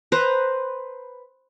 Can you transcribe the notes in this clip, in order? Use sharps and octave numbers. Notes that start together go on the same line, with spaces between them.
B4 C5 A#5